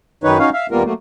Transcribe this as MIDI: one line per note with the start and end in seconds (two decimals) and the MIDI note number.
0.24 0.39 42
0.24 0.39 51
0.24 0.39 63
0.24 0.39 71
0.24 0.39 73
0.39 0.50 61
0.39 0.50 63
0.39 0.50 66
0.39 0.50 73
0.39 0.50 77
0.53 0.67 76
0.53 0.67 77
0.71 0.83 39
0.71 0.83 55
0.71 0.83 58
0.71 0.83 59
0.71 0.83 65
0.71 0.83 70
0.84 0.93 54
0.84 0.93 57
0.84 0.93 58